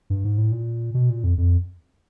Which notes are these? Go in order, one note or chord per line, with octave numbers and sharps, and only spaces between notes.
G2
G#2
A2
A#2
B2
A#2
F2
F2